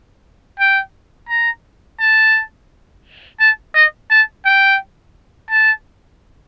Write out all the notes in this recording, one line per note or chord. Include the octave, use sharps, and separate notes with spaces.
G5
A#5
A5
A5
D#5
A5
G5
A5